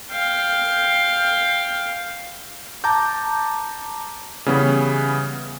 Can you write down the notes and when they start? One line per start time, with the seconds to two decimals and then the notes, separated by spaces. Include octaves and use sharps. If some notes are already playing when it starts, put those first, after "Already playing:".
0.11 F5 G5
2.84 A5 A#5 D6 G6
4.46 C#3 E3 G3 B3 C#4